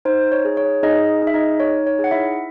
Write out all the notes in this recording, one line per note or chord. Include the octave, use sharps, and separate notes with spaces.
D#4 C5
C#5
G#4
C#5
D#4 G#4 D#5
D#4
E5
D#4 D#5
D#4 C#5
C#5
G#4
F#5
E4 E5